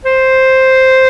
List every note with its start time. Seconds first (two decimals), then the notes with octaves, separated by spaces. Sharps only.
0.05 C5